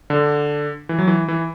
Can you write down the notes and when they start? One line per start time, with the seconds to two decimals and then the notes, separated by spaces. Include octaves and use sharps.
0.10 D3
0.89 E3
0.99 F#3
1.08 E3
1.28 E3